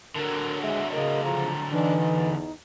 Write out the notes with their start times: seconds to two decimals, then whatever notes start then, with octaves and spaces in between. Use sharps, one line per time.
0.15 D3 F#3 A#4
0.62 G#3 E5
0.92 C#3 A#4 D#5
1.24 F3 A#5
1.72 E3 D4 D#4
2.13 E2